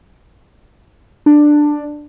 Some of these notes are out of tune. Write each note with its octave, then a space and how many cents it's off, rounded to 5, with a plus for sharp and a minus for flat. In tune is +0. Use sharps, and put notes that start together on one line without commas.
D4 +10